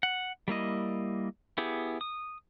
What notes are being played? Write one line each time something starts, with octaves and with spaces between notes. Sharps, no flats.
F#5
G3 A#3 E4 D#5
B3 E4 G4 G#4
D#6